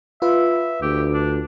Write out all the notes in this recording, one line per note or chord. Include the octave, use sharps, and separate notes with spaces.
F4 B4 E5
D2 G4
D4